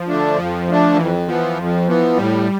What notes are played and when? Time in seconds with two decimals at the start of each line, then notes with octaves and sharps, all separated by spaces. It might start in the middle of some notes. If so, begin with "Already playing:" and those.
Already playing: F3
0.08 D3 A3 D4
0.38 F2 F3
0.67 D3 A3 D4
0.98 F2 E3
1.28 E3 F3 B3
1.58 F2
1.88 E3 B3
2.17 A2 G3